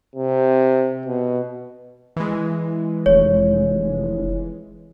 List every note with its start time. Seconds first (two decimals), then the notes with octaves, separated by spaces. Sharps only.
0.16 C3
1.06 B2
2.16 E3 G#3
3.06 F1 C#5